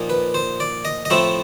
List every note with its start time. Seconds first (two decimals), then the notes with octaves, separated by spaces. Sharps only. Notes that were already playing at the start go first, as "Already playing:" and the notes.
Already playing: A#2 F3 A#3 D#4
0.10 B4
0.34 C5
0.60 D5
0.85 D#5
1.05 D#5
1.10 A2 F3 A3 C4 E4 E5